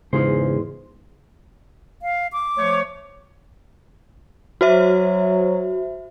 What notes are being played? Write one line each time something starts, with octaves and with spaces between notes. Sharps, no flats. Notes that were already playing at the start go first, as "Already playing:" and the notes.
E2 G#2 C#3 F4 G#4 C5
F5
D6
F3 A3 C#5
F#3 F#4 C5 E5